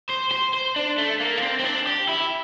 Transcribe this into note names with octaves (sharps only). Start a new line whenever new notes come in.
C5
C5
C5
D4
A3
A#3
D4
C4
C4
D4
G4
E4